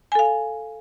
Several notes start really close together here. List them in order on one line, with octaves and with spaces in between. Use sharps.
G#5 A4 F5